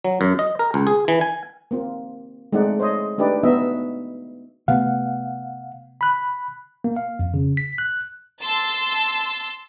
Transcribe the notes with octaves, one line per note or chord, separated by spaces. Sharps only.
F#3
F#2
D#5
A#4
C#2
G#4
E3
G#5
A#3 C4 F4
G#3 A3 C4 D#4 D5 F#5
C5 C#5 D#5
A3 D4 D#4 G4 B4 D5
B3 D#4 F#4 D#5 E5
C3 A3 B3 F5 F#5
B5 F#6
A#3
F5
F2
C#3
B6
F#6
A5 C6 E6 A6